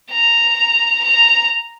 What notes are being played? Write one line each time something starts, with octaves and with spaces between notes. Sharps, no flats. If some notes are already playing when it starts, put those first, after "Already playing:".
A#5
A#5